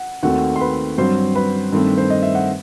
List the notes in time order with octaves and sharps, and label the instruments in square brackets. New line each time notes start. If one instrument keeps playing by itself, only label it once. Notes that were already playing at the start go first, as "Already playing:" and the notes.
Already playing: [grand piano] F#5
D#2 D#3 A3 C4 F#4 F#5
C6
B4 B5
G2 F#3 C4 C5 C6
B4 B5
G2 D#3 A3 C4
C5
D#5
E5
F#5